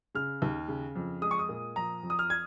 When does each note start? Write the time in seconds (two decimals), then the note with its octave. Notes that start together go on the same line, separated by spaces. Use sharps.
0.15 C#3 F6
0.42 D#2
0.68 C#3
0.95 F2
1.22 G#3 D#6
1.31 C#6
1.39 D#6
1.49 A#2
1.76 F3 A#5
2.03 F2
2.10 D#6
2.19 F6
2.30 G#6